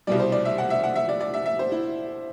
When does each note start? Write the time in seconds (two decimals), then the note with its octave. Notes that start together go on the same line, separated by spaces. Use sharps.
0.07 C2 B2 G3 D5
0.20 C5
0.32 D5
0.45 E5
0.58 F#5
0.70 E5
0.84 F#5
0.96 E5
1.09 D5
1.21 D5
1.34 E5
1.46 E5
1.59 C5
1.72 E4